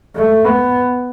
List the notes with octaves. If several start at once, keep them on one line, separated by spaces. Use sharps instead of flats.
A3
B3